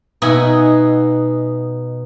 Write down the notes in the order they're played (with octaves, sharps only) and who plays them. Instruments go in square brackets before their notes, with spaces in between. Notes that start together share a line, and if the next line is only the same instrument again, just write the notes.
[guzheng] B2 D#4 E5 F#5 G#5